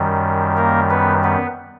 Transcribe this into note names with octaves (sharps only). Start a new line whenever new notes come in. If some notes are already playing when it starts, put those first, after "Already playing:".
Already playing: F#2 D#3 G3
A#3 A#4
B3 B4
B3 B4